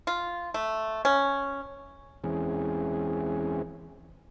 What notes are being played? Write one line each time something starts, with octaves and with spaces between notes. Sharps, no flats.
F4
A3
C#4
E2 E3 G#3 C4 C#4 G#4